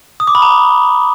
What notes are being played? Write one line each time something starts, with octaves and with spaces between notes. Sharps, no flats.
D#6
D6
B5
A#5